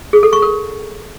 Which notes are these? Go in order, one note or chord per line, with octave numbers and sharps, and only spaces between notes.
G#4
A4
C#6
A#4